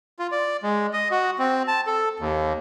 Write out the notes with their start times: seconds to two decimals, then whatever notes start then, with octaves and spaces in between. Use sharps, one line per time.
0.19 F4
0.32 D5
0.63 G#3
0.93 D#5
1.11 F#4
1.39 C4
1.68 A5
1.87 A4
2.20 D#2